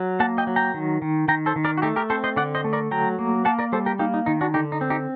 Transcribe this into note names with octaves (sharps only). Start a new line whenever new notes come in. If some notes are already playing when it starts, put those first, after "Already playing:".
Already playing: F#3
A#3 F#5 A5
D#5 G5
F#3
G5 A#5
D#3
D#3
D#3 G5 A#5
A4 C5
D#3
A#4 D5
F#4
A3 D#4 G4
G4 A#4
C4 A4 C5
C5 D#5
D3 D5 F#5
C5 D#5
A3
A#4 D5
F#3 G5 A#5
A#3
A#3 F#5 A5
A#4 D5
G3 A4 C5
G4 A#4
A#3 D#4 G4
D#4
D#3 D#4
D4 F#4
D3 D#4 G4
D#4
C4
D#4 G4